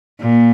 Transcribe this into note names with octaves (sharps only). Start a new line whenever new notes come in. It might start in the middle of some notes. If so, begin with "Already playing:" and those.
A#2